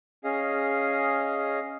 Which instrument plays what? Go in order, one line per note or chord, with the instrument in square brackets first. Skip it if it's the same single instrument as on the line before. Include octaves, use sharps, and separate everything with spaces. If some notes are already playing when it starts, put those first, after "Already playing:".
[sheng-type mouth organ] C#4 G#4 D#5 F5